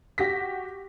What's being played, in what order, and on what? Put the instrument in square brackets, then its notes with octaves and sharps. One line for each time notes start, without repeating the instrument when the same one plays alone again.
[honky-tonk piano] F#4 G4 A#6 B6